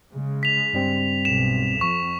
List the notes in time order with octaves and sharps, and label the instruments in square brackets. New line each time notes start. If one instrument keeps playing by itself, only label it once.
[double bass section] C#3 G#3
[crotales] B6 F7
[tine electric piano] G2 G3 C4
[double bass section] B1 [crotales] E7
[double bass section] F2 [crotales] C#6